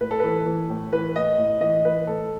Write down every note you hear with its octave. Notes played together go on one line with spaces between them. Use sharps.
A2 B4
A4
E3 B4
E3
A2
E3 B4
A2 D#5
A2
E3 D#5
E3 B4
A2 A4